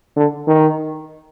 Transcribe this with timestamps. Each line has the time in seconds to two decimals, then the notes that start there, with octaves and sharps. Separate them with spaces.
0.16 D3
0.47 D#3